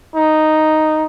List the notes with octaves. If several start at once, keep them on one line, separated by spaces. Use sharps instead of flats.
D#4